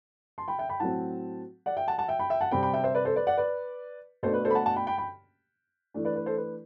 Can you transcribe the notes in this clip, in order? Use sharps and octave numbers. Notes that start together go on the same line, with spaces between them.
A5 C6
G5 B5
E5 G5
G5 B5
A2 F#3 C4 F#5 A5
D5 F#5
E5 G5
F#5 A5
F#5 A5
E5 G5
G5 B5
E5 G5
F#5 A5
C3 G3 C4 G5 B5
G5 B5
E5 G5
C5 E5
B4 D5
A4 C5
B4 D5
D5 F#5
B4 D5
B2 A3 D4 A4 C5
B4
A4 C5
B5
F#5 A5
F#5 A5
G5 B5
G5 B5
G5 B5
E3 A3 D4
B4 D5
B4
A4 C5
B4